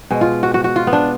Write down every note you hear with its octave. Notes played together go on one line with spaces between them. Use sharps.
B2 G#3
F4
F#4
F#4
F#4
F4
B3
D4